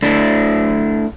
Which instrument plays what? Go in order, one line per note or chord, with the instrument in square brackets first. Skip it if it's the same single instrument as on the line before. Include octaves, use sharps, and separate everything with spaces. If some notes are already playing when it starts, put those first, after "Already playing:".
[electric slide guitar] A3 D4 E4